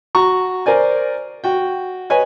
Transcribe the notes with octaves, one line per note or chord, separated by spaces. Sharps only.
F#4 A#5 C#6
A#4 C5 D5 G#5
F#4 G5
B4 C#5 D#5 G#5